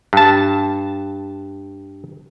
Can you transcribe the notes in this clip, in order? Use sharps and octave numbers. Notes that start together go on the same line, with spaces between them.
G2 A5